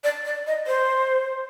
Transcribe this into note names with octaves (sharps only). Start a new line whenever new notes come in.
D5
D5
D#5
C5